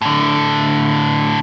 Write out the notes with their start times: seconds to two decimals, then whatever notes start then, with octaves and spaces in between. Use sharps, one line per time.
0.02 A2 D3